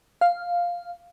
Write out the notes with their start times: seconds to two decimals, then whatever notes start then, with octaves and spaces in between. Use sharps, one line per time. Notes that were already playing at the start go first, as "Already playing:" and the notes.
0.21 F5